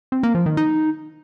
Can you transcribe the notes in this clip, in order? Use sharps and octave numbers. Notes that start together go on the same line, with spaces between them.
C4
A#3
F3
D#3
D#4